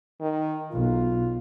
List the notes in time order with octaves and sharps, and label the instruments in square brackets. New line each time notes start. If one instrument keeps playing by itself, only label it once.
[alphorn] D#3
[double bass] B1 [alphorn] F4